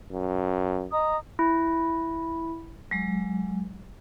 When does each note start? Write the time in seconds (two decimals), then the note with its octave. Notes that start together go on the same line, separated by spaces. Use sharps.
0.11 F#2
0.92 D#5 A#5 D#6
1.39 E4
2.91 F#3 G#3